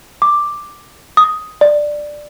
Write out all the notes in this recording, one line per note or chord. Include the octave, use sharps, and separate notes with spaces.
D6
D#6
D5